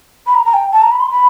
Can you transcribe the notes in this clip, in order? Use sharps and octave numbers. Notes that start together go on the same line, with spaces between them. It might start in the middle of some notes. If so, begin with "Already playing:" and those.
B5
A#5
A#5
G5
A5
A#5
B5
C6
B5